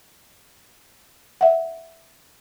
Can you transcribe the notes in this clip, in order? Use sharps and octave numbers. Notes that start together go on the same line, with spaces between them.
E5 F#5